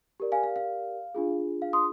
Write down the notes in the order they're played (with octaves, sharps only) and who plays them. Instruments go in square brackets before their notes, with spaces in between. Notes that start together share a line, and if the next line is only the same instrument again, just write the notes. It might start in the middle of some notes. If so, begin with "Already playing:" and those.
[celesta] G4 A#4 D5
F5 G#5
F5
F5
D4 F4 G#4
F5
C6 D#6